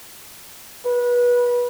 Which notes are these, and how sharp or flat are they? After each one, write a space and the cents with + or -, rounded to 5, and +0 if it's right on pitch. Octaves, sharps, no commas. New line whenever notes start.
B4 -25